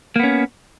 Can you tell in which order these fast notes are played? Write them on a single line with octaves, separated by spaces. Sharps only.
A#3 B3 C#4